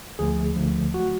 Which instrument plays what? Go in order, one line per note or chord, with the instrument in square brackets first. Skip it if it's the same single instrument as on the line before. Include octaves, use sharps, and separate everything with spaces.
[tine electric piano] D2 D3 F3 A3 G#4
D2 D3 F3 A3
F#3 A3 F#4